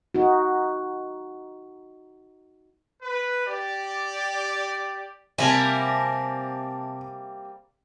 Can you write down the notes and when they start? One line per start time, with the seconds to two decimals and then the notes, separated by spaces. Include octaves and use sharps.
0.15 D#4 F#4
3.02 B4
3.47 G4 D5
5.38 C3 G3 A#3 C4 E5 G#5 A5